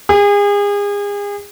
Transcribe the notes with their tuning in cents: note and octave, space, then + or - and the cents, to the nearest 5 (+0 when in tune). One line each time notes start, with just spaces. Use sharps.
G#4 -35